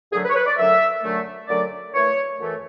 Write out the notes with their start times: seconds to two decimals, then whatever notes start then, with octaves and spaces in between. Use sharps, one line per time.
0.12 F#2 D3 F#3 A3 G#4
0.24 B4
0.29 C#5
0.36 B4
0.46 D5
0.57 F#2 D3 F#3 A3 E5
1.02 F#2 D3 F#3 A3
1.48 F#2 D3 F#3 A3 D5
1.93 F#2 E3 A3 C#5
2.39 F#2 E3 A3